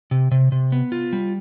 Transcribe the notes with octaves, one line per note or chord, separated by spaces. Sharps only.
C3
C3
C3
B3
F4
G3